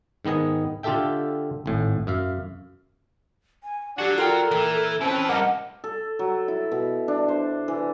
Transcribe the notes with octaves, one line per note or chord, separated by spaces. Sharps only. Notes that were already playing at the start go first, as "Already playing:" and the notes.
G#2 D#3 B3 D#5 G#5
D3 F4 G4 A4 E5 G5
G#1 A2
F#2 E5 F5
G#5
F#3 D4 F#4 G4 D5 F#5
F4 A4 A#4 D5 G5
A#2 E3
E3 C4 C#4 B4 A5
G2 A3 A#4 D#5 F#5 D6
A4
F#3
E4
B2
D4
C5
E3